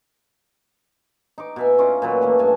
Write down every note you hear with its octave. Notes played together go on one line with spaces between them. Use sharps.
D#4 D6
B2 E5 G#5
C#4 D#4 F4 D5
A#2 F#3 B4
E3 A3 A#3
G2 G#5 A5